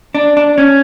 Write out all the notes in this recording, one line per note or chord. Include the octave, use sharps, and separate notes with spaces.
D4
D4
C#4